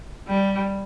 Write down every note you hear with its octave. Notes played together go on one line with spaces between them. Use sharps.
G3